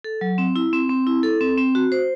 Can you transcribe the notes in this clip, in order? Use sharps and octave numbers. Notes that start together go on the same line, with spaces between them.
A4
F#3
C4
E4
C4
C4
E4
A4
C4
C4
F#4
C5